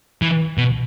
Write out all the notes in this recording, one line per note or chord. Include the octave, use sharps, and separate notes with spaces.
E3
B2